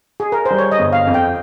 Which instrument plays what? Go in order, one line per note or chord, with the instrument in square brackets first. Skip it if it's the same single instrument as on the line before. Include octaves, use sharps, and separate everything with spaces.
[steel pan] G#4
A#4
C5
[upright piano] G3
[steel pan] C#5
D#5
[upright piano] G1
[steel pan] F5
[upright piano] F2
[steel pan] G5